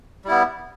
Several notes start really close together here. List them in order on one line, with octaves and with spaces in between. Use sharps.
G3 E4 B3